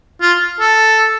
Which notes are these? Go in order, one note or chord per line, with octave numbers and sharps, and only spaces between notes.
F4
A4